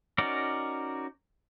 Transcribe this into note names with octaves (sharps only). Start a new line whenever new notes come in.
C#4 D#4 F#4 A#4 D5